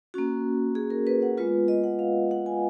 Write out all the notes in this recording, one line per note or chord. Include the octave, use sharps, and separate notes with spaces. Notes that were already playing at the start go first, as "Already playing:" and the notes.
A#3 C#4 F#4
G#4
A#4
B4
F#5
G#3 B3 F4 B4
D#5
F#5
F5
F#5
G#5